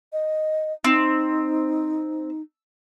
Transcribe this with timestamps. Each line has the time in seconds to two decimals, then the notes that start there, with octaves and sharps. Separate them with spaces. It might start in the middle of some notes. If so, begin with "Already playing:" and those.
0.13 D#5
0.84 C4 D#4